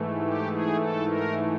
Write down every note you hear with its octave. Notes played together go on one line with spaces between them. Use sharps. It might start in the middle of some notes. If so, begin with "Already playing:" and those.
Already playing: G#2 E3 A3
G4
G#4
A4
A#4